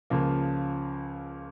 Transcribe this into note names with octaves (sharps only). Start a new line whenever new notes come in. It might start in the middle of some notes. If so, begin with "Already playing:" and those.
C#2 C#3 F3 A#3